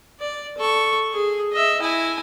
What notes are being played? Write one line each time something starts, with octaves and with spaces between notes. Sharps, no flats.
D5
A4 C#6
G#4
D#5 E5
E4 G#5